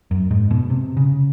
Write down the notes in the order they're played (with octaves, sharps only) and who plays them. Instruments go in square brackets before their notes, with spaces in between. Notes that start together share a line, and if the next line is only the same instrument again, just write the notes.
[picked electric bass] F#2
G#2
B2
C3
C#3